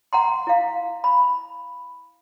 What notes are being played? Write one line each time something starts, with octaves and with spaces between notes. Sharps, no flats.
F#5 A#5 C6
E4 F5
B5